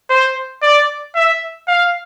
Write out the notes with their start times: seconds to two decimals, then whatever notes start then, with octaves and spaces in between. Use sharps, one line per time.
0.10 C5
0.63 D5
1.16 E5
1.68 F5